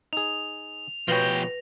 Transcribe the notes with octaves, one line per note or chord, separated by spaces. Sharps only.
D#4 G#4 F7
B2 F3 B3 G4 B4 C#5 A#6